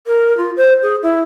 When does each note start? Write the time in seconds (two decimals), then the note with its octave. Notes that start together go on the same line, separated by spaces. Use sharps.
0.07 A#4
0.37 F4
0.57 C5
0.82 G#4
1.02 E4